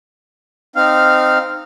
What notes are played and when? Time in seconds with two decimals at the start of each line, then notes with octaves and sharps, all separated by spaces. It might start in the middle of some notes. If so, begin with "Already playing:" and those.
0.76 C4 D#4 F5 F6